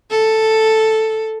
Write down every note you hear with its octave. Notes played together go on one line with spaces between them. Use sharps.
A4